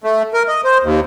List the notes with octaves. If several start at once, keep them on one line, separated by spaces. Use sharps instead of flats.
A3
A#4
D#5
C5
D#2